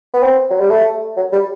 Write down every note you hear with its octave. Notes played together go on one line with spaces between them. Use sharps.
B3
C4
F#3
G3
A3
F#3
G3